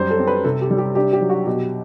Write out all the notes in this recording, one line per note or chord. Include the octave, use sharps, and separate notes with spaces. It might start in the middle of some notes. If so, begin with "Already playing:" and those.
Already playing: F#2 G3 C5
A4
C4
B4
C3 A4
G4
G3
G4
D4 G4
G4
F#3
F#4
B2 G4